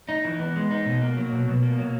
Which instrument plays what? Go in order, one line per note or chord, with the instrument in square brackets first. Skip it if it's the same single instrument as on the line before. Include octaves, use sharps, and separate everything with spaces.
[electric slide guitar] D#4
E3
B3
G#3
D#4
B2
A#3
F#3
B2
B2
A#3
F#3